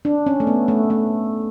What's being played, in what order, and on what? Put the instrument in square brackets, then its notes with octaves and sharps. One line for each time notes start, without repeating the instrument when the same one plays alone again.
[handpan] D4
C#4
A3
B3
A3
A3